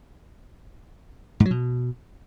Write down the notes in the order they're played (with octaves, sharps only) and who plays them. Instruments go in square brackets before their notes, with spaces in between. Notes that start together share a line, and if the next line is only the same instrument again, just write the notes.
[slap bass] G#2
F#3
B2